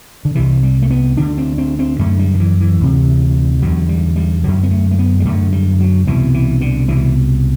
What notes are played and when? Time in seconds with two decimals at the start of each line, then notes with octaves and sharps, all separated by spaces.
0.25 D3
0.35 C2 C3 E3
0.63 G3
0.82 A3
0.91 B3
1.17 D2 D3 D4
1.38 C4
1.58 C4
1.79 C4
1.99 F#2 D3 A3
2.19 G3
2.34 D3
2.40 E3
2.60 E3
2.81 D2 C3
3.62 E2 D3 F#3
3.89 G3
4.16 G3
4.44 F#2 D3 F#3
4.63 B3
4.71 A3
4.91 A3
4.99 B3
5.20 G3
5.25 F#2 D3 A3
5.53 G3
5.80 F#3
6.07 C2 B2 E3
6.34 E3
6.61 D3
6.88 C2 B2 E3